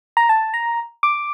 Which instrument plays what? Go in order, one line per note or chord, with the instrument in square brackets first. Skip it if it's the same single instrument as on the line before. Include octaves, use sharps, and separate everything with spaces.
[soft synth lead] A#5
A5
A#5
D6